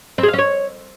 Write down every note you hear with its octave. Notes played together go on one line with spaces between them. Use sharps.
C4
G#4
F5
C#4
C#5